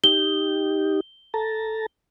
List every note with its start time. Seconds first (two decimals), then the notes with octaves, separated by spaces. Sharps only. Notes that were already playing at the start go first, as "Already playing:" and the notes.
0.04 D#4 G4 G7
1.34 A4 A5 A#5